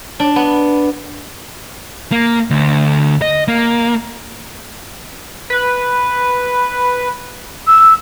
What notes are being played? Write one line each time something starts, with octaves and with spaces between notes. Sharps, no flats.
D4
B3
A#3
D2
D#5
A#3
B4
E6